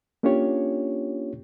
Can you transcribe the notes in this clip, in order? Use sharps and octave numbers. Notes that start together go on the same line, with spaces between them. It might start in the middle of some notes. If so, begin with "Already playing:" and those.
A#3 C#4 D4 F4 G4 C#5